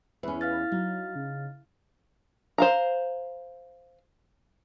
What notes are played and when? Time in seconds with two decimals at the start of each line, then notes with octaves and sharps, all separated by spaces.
0.23 E2 C#4 B4
0.41 F5 F6 A6
0.72 F#3 D#4
1.15 C#3
2.58 C5 F5 A#5